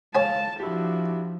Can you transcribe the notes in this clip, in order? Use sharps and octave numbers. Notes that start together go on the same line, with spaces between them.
C#2 C#5 F5 G#5 A5
F3 D4 E4 F#4 G4